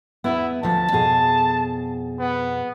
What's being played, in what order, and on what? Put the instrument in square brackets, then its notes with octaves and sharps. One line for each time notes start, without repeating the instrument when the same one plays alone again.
[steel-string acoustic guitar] E2 G#2 B3 [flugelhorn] E4
[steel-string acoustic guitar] D2 F3 [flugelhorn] A5
[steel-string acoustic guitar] F2 B2 G#4
[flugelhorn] B3